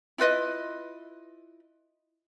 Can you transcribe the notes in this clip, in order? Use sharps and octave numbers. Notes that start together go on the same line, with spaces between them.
E4 F4 B4 D#5